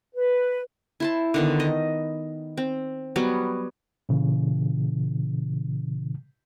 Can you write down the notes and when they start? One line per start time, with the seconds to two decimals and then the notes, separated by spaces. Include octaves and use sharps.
0.15 B4
1.00 E4 C5 A5
1.34 D3 D#3 B3
1.60 D#5
2.57 C4
3.16 F#3 G3 B3
4.09 A#2 C#3 E3